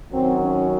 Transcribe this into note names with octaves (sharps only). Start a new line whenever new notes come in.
F#2 D#3 F#3 C4
C#4